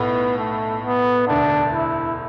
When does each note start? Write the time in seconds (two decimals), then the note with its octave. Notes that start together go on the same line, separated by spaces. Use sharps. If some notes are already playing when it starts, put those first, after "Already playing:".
Already playing: B1 A2 B3
0.38 A3
0.83 B3
1.27 E1 D2 D3 D4
1.73 E4